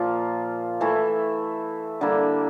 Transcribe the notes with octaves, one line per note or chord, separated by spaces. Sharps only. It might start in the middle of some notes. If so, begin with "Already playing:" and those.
Already playing: A#2 F3 A#3 F4
E3 A3 E4
D3 G3 A#3 E4